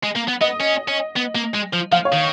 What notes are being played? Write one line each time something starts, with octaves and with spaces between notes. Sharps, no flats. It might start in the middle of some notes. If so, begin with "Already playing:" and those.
G#3
A#3
B3
B3 D#5
C#4
C#4
B3
A#3
G#3
F3
F3 F5
C#5
D#3